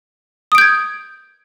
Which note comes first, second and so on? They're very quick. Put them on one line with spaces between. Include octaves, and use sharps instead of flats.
D#6 D7 G6 G#6